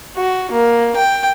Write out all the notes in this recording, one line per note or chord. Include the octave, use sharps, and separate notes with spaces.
F#4
A#3
G5